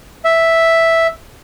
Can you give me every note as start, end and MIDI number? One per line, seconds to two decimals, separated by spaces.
0.25 1.07 76